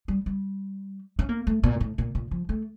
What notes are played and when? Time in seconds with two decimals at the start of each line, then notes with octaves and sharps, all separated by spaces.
0.08 G3
0.26 G3
1.19 C#4
1.29 A#3
1.47 A3
1.64 A#2
1.80 A2
1.98 A#2
2.15 A#2
2.31 F3
2.49 A3